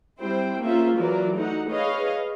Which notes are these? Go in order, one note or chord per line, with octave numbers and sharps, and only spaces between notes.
G3 C4 E4 C5 G5
A#3 C#4 F4 G#4 C5 E5
E3 F#3 A#4 D5
A3 D#4 F#4 F#5
G#4 B4 C#5 D#5 F5